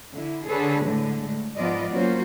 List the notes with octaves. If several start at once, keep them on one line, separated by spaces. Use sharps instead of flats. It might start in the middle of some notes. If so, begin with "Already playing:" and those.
D3 E4
D3 G#4 A4 B4 C#5
A2 D3 G#3
A2
G#2 F3 B3 F4 D5 D#5
F#3 A#3 C#4 F4 F#4 C5